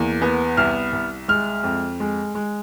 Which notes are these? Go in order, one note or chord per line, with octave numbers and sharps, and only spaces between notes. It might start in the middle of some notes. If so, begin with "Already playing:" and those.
Already playing: E2 A#3
B3
C2 F6
C2
G#3 F6
F2
G#3
G#3